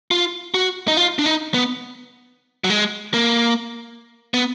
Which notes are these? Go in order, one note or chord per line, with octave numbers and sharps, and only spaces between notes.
F4
F#4
D#4
F4
D4
D#4
B3
F#3
G#3
A#3
B3